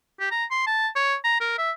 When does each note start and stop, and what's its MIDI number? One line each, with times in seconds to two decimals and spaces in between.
0.20 0.30 67
0.31 0.45 82
0.51 0.63 84
0.67 0.88 81
0.96 1.16 73
1.24 1.38 82
1.40 1.58 70
1.58 1.71 76